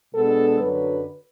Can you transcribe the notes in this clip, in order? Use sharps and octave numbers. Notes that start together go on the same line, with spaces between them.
B2 G#3 B3 D4 A4
F#2 D3 F#3 B4